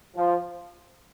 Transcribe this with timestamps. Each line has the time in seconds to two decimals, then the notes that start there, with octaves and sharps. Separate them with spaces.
0.16 F3